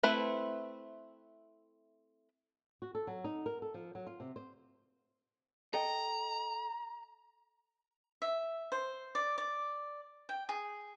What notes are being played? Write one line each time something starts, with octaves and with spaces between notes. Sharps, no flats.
A3 C4 E4 B4
F#4
A4
F#3
D#4
A#4
A4
F3
F#3
F4
C3
C5
A4 D#5 G5 A#5
E5
C5
D5
D5
G5
G#4